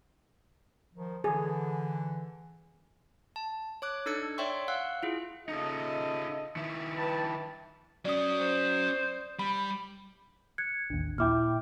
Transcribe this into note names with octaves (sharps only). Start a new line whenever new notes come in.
D#3 F3
D3 E3 G#4
A5
C#5 D6 F#6
D4 D#4 A4 E6 G#6 C#7
C#5 D5 E5 G5 C6 C#6
F5 F#5 E6 F#6
E4 F4 G#4
C#3 D#4 F4 A4 D#5
D#3 E4
B4 G5 A5
F#3 C#4 D5 D#6
C5
G3 B5
F#6 G#6 C#7
A1 D#2 D4
A#2 E4 E5 G5 D6 F6